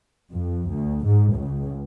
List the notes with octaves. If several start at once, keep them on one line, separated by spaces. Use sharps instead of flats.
F2
D2
G#2
C#2